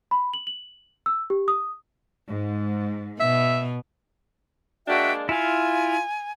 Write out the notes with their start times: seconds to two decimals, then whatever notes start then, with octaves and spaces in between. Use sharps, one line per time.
0.11 B5
0.34 F#7
0.47 F#7
1.06 E6
1.30 G4
1.48 D#6
2.27 G#2
3.20 B2 E5
4.87 G#3 A#3 D4 F#4 E5 G5
5.29 E4 F4 F5 G#5